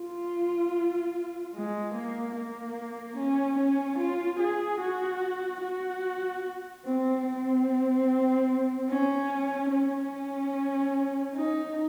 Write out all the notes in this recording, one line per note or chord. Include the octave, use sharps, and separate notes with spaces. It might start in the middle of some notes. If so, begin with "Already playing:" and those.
Already playing: F4
G#3
A#3
A#3
C#4
C#4
F4
G#4
F#4
F#4
C4
C4
C#4
C#4
D#4